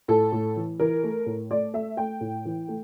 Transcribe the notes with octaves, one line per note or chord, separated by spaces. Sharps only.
A2 A4
A2
E3
E3 A#4
A3
A2
A3 D5
A3 E5
A3 G5
A2
E3
A3